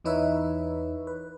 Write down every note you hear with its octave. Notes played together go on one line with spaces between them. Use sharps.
E2 E3 D#4 B4 C#5 E5
B4